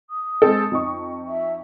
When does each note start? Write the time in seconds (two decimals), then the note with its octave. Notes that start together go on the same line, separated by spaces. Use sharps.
0.10 D#6
0.42 G#3 C4 A4
0.72 F2 D#4 C#6
1.27 E5